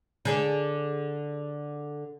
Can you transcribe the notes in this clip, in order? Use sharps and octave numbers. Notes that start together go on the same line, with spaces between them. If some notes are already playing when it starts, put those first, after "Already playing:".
D3 G#4 D5